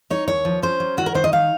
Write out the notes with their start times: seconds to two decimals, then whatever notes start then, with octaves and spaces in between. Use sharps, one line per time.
0.10 D#4 C#5
0.27 D#2 C#5
0.45 F3
0.63 C#4 C5
0.80 F#3
0.97 D#3 F#4
1.06 A#4
1.14 D#3 C5
1.24 D#5
1.32 D#4 F5